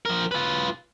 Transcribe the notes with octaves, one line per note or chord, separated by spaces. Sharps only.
F3 A#4
F4 B4